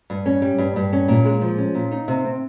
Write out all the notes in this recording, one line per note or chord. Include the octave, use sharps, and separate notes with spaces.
G2
C#4
G3
G2
G2
C#4
A#2
G#3
F3
C#4
A#2
D#4
C3
C4